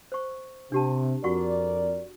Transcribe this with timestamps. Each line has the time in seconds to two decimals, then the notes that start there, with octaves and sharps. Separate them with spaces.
0.12 C5 C#6
0.72 C3 D4 G4 A5
1.24 F2 F#4 A#4 D5 F#5 C#6